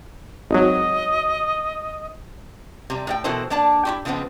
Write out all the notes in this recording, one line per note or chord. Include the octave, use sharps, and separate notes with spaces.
G#1 F#3 D#5
C3 G3
A2 D#4 G5
B2 E3 E4 A4 A#4 C5
A#3 D4 D5 A5
E4 F#4 G4
C#3 F3 G#3 B3 C4